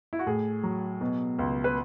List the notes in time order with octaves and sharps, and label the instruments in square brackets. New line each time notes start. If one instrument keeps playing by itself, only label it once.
[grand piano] E4
F#4
A2 G#4
F#3
B2
C#2
B4